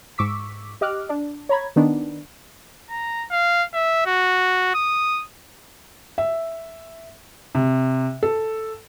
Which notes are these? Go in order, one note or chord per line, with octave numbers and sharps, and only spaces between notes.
G#2 C#6 D6 E6 B6
G4 D#5 D6 F6 F#6
D4
C#5 A#5 B5 G#6
D#3 B3 D4 D#4
A#5
F5
E5
F#4
D#6
E5
C3
A4